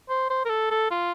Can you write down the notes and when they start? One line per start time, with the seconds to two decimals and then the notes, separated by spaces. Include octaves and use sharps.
0.09 C5
0.30 C5
0.45 A#4
0.50 A4
0.71 A4
0.91 F4